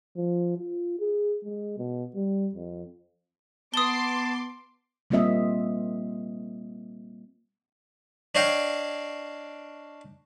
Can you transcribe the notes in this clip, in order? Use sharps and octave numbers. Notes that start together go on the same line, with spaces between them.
F3
F4
G#4
G#3
B2
G3
F2
B3 A5 C6 D6 D#6 G7
G3 A#3 C4 F4 D#5 E5
D4 C#5 D#5 F5 G5